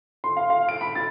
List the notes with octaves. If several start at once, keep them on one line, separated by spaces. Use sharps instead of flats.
C6
F5
F5
D7
B5
A6